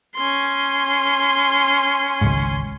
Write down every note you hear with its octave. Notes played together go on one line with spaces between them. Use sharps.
C#4 C6
G#1 C#2 G#2